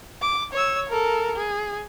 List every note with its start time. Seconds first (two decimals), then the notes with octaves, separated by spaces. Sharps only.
0.22 D6
0.53 C#5 E6
0.90 A4 A#4
1.36 G#4